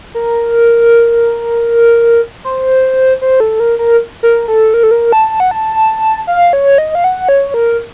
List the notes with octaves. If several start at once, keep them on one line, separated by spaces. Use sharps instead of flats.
A#4
C5
C5
A4
A#4
A#4
A#4
A4
A#4
A4
A#4
A5
F#5
A5
F5
C#5
D#5
F5
F#5
C#5
A#4